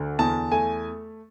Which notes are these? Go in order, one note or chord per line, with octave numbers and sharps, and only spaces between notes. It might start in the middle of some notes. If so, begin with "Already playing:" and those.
Already playing: D2 D3
E2 A5
A3 G#5